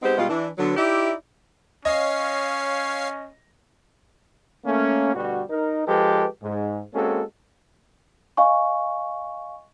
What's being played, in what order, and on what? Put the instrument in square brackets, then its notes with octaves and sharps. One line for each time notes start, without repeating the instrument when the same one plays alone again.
[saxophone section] G#3 B3 C4 D#4 G4 C5
B2 G3 G#3 F4
E3 D4
D3 F#3 B3
D#4 E4 G4 D5 E5
[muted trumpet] C#4 [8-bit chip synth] C#5 F5 C7 [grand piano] D#5
[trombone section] A3 A#3 C#4
D2 B2 G3 F#4
D#4 A#4
F3 G#3 G4 A4 B4
G#2
G#3 A#3 C4 C#4 F#4 A4
[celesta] D#5 F5 G#5 C#6